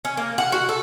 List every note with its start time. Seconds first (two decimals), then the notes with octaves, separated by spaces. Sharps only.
0.05 C#4
0.17 A#3
0.38 F#5
0.52 F#4
0.69 A4